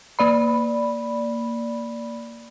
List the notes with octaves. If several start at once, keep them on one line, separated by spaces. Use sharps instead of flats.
A#3 D5 B5